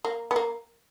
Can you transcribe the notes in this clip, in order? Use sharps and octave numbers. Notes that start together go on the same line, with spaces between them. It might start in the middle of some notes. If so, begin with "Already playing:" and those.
A#3
B3
A#3